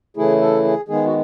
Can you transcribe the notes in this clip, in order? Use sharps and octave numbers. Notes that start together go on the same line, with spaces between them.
C#3 E3 A3 E4 G#4
A4
G#4
D#3 G#3 B3 G#4
F#4